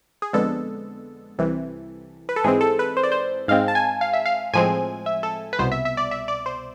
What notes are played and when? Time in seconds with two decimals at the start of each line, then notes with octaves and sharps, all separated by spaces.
0.22 G#4
0.33 F2 D3 G#3 B3 A4
1.38 C2 C3 E3
2.29 B4
2.36 A4
2.44 G#2 E3 G#3 C4 G#4
2.61 A4
2.79 B4
2.97 C5
3.03 D5
3.12 C5
3.48 G#2 G#3 C4 F5
3.68 A5
3.75 G#5
4.01 F5
4.13 E5
4.26 F5
4.53 A2 F3 G#3 C4 G#5
5.06 E5
5.23 A4
5.53 B4
5.59 C2 B2 B3 C5
5.72 E5
5.85 E5
5.97 D5
6.11 E5
6.28 D5
6.46 C5